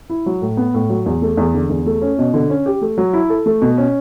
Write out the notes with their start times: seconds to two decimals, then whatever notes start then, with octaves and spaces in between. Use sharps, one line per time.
0.10 E4
0.26 F#3
0.42 A2
0.57 B3
0.74 A2
0.90 F#3
1.06 E2
1.22 A3
1.37 E2
1.54 D3
1.69 E2
1.86 A3
2.02 C#4
2.18 B2
2.34 D3
2.50 C#4
2.66 G4
2.82 A3
2.98 F#3
3.13 E4
3.29 A4
3.46 A3
3.62 B2
3.78 C#4